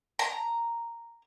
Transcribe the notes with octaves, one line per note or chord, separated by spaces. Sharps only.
A#5